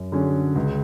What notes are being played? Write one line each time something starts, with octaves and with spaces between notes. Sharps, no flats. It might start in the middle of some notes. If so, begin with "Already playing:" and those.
Already playing: F#2
D3 F#3 C#4 G#4
C#2